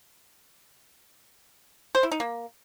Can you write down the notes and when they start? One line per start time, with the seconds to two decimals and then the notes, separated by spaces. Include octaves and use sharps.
1.95 C5
2.03 E4
2.11 D#4
2.20 A#3